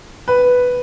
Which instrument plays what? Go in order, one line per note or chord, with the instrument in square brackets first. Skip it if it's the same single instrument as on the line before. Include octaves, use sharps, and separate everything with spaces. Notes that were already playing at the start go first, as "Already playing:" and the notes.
[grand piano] B4